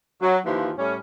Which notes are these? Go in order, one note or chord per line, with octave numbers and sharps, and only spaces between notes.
F#3
D#2 E3 F3
A2 G3 C#4